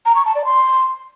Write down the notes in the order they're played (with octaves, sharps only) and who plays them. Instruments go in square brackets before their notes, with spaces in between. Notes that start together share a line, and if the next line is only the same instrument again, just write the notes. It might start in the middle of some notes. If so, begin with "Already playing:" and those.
[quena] A#5
C#6
A5
D5
C6